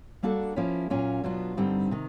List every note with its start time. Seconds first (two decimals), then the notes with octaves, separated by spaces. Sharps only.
0.23 G3 A#3 D4 F#4 A4
0.56 F3 A#3 C#4 E4
0.90 A#2 F#3 A#3 C#4 F4
1.24 B2 F#3 B3 D4 F4
1.57 G2 D3 G3 C4 D#4
1.91 C3 D#3